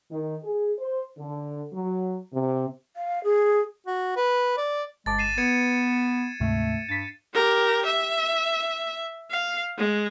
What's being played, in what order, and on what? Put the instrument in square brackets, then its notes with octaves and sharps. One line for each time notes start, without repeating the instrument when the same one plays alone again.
[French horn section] D#3
G#4
C5
D3
F#3
C3
[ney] F5
G#4
[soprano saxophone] F#4
B4
D5
[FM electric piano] G1 A5 D6 [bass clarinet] G#3 [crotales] A6
[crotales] C7 D#7 E7
[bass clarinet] B3 [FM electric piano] B4 [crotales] G#6 C#7 D#7
[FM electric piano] D2 G#2 C3 [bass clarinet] A3
[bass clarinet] G2 [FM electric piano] A6 B6
[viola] G4 A#4
E5
F5
G#3